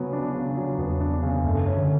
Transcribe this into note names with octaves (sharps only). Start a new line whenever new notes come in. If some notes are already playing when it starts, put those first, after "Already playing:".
Already playing: C#3 F#3 B3
D4
C#3
F#3
E2 B3
D4
C#3
F#2 A3
C#4
D3